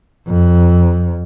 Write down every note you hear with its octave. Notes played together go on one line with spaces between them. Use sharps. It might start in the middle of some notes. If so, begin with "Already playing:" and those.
F2